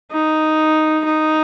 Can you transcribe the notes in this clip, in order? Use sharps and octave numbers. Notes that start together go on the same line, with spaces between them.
D#4
D#4